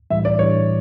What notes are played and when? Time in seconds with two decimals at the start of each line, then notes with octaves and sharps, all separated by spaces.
0.10 A2 E3 G3 E5
0.25 D5
0.39 A2 E3 G3 C#5